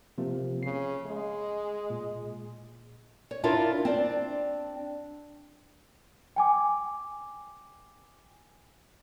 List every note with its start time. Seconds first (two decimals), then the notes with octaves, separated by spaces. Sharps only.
0.18 C3 F3 A#3
0.63 C#3 C7
1.06 G#3
1.90 A#2
3.31 C#5
3.44 D4 E4 F4 A#4 C#5
3.85 C4 D4 D5
6.36 G5 G#5 D6